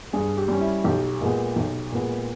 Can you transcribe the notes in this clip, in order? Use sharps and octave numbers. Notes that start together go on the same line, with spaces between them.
G2 G#4
G4
G3 C#4
E4
B1 G4
A#2 G#3 B3
B1
A#2 G#3 B3